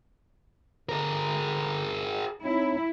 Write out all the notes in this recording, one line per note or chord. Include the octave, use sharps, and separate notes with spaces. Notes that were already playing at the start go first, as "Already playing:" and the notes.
D3 G#4 A#4
C4 D#4 E4 C#5